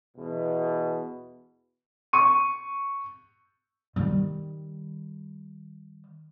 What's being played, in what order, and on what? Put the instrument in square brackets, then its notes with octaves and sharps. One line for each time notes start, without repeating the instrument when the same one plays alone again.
[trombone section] E2 B2
[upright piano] C#6 D#7
[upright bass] D#3 G3